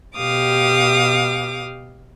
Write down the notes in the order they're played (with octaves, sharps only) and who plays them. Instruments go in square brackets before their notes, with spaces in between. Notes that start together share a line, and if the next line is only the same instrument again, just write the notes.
[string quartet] B2 G4 F5 D6 D#6